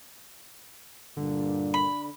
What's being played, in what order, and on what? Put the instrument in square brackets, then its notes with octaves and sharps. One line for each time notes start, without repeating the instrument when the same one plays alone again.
[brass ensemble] G2 A#2 [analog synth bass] D3
[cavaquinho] B5